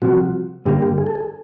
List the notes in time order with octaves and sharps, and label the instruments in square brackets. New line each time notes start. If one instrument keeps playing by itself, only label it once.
[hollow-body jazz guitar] C2 C3 F3 [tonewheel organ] F#4
[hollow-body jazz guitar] G2 D3 G3 A#3 [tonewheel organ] G4
[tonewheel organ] G4
G#4
A4
G#4